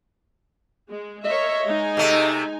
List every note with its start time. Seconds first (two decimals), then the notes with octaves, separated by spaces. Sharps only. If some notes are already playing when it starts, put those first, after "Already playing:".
0.89 G#3
1.25 A#4 C#5 D#5 E5
1.64 G#3 D#4 G#5
1.97 C3 A3